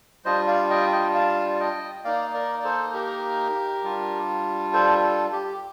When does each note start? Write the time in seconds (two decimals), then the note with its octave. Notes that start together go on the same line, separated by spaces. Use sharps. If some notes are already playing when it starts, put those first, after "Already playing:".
0.25 G3 D4 F4 C5 D#5
0.47 D5 F5
0.70 D#5 G5
0.92 D#5 G5
1.15 F5 A5
1.60 D#5 G5
2.04 A#3 D#4 D5 F5
2.34 A#4 D5
2.58 D5
2.64 A4 C5
2.94 G4 A#4
3.83 G3 D4 F4
4.73 A4 C5
5.03 A4
5.32 G4